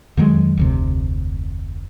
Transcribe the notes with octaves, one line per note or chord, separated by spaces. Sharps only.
F2 D#3 F#3 G#3
F1 D2 C3